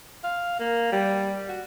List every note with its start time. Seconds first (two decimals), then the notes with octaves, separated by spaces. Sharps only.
0.23 F5
0.59 A#3
0.92 G3
1.48 F#4